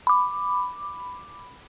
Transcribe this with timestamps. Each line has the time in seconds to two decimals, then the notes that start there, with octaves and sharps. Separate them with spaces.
0.07 B5 D6